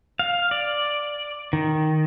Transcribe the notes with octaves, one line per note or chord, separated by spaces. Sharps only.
F5
D5
D#3